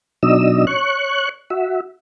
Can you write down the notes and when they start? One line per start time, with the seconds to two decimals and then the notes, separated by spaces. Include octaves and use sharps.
0.23 B2 F#3 D4 D#4 D#5 E6
0.67 C#5 C#6 F#6
1.50 F#4 E5